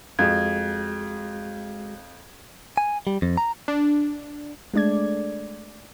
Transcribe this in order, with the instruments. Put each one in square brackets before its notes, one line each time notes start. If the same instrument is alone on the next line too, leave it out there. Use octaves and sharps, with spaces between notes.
[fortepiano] F2 [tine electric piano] G#3 F#4 G#4 [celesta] G#6
[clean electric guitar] G#5
G3
F2
A#5
[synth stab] D4
[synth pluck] G#3 A3 D4 D5 G#6